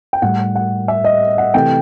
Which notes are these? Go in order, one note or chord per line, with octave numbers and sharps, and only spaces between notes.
G5
A2 G3 F#5
F#5
E5
D#5
F#5
C3 E3 A3 G5